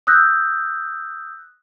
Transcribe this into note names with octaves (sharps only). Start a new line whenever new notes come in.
D#6 E6 F#6 G6 A#6